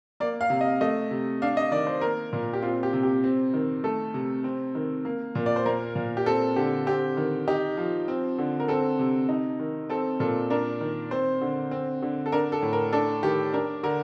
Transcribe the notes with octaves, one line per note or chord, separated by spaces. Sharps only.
A#3 D5
F5
C3
D#5
A3 D#5
C3
D4 F5
D#5
D#3 D5
C5
A#3 A#4
A#2
G4
C4 F4
G4
C3
G4
C4
D#3
A3 A4
C3
C4
D#3
A#3
A#2
D5
C5
A#3 A#4
A#2
G4
C4 A4
D3 G4
C4 G4
D#3
D#4 G4
F3
C4
D3
A#4
C4 A4
C3
D#4
D#3
C4 A4
A#2 A4
D4 A#4
D#3
C4 C5
D3
C4
D3
A4
D4 A#4
A4
A2
A#4
D4 A4
D#3 G4
D4 A#4
D3 A#4